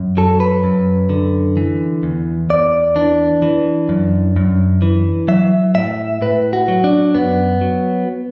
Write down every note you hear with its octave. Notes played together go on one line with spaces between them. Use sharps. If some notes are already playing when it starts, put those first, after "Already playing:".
Already playing: F#2
F#3 A4
B4
F#2
D3
E3
E2
E2 D5
E3 D4
E3
F#2
F#2
E3
F#3 E5
A2 E5
A2 B4
F#4
F#3
D4
F#2 B3
F#3